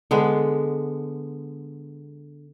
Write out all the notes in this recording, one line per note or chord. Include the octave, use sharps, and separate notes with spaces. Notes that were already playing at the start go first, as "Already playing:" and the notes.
D3 G#3 B3